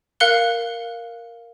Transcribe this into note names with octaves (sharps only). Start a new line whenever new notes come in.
A#4 F5 F#6 C#7 G7